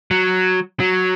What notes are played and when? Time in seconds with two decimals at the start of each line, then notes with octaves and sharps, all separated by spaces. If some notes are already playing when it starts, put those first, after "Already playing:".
0.11 F#3
0.80 F#3